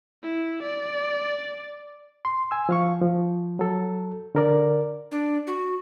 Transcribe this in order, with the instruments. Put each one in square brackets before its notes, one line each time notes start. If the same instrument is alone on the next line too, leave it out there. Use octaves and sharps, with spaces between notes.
[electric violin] E4
D5
[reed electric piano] C6
G#5 E6
F3 F5 C#6
F3
F#3 A4
D3 A#4 D5
[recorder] D4
F#4